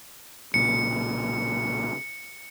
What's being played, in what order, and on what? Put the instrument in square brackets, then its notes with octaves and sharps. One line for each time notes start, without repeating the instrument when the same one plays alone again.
[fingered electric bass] B1 A#2 C#3 [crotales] C#7